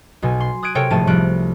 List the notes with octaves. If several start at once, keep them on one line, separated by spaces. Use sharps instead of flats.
B1 B2 G#5
C6
D#6 F#6 G#6 D7 D#7
C3 A4 A#4 C#5 G5 D7
G#1 A2 F3 A3 A5 D#7
C2 F3 G3 F#6 D7